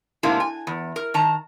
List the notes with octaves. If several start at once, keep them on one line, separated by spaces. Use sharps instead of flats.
G#2 C3 A3 A#3 D4 E4
G#5
E2
A#4
D#3 A5 A#5